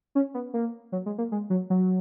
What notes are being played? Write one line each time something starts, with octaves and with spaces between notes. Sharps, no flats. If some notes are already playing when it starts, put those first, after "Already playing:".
C#4
B3
A#3
F#3
G#3
A#3
G#3
F#3
F#3